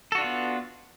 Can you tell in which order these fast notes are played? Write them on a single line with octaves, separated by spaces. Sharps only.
A4 F#4 D4 F4 B3